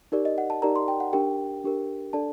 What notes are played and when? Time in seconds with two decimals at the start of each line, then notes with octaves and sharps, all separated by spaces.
0.12 D#4 G4 A#4 D5
0.25 D#5
0.38 F#5
0.50 A5
0.62 D#4 G4 A#4 D5 A#5
0.76 C6
0.88 G5
1.00 F#5
1.13 D4 G4 A#4 G5
1.64 D4 G4 A#4
2.13 D4 A4 D5 A5